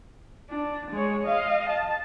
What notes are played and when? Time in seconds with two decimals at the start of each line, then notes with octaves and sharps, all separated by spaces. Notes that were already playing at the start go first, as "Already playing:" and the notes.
0.49 D4
0.91 G#3 C#5
1.23 D#5 F5
1.69 A5